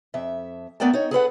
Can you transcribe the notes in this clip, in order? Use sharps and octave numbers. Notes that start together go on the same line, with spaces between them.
F2 E5
A3 B3 A#4 D5 G5 A5
D#4 C#5
G#4 A4 B4 F#5